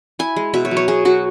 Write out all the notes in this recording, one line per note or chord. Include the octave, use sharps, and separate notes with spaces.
E4 G#5
G#3
B2 E5
C#5
F#3
C#5
B2 G#4
F#3 F#4